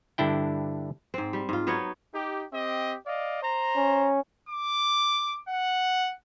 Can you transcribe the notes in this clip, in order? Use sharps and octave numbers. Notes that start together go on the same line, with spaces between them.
G2 D3 D4 E4 G5
G#2 C4
G3
G#2 F4
F#3 B3 D#4 C#5
D#4 G4
C4 G4 D#5
D5 D#5 F5
C5 A#5
C#4
D6
F#5